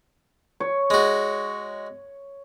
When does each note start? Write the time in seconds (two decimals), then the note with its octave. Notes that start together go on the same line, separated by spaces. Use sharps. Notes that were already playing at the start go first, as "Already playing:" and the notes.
0.60 C#5
0.90 G#3 F#4